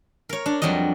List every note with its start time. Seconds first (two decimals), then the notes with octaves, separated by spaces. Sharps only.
0.29 A#4 C#5
0.46 D4
0.62 F2 F#3 G3 D4 D#5